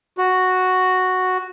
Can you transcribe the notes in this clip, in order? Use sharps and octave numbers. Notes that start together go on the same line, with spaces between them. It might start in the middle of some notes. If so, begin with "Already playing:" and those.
F#4